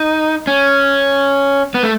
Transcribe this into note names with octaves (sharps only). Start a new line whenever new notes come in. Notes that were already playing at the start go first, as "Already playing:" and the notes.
Already playing: D#4
C#4
B3
A3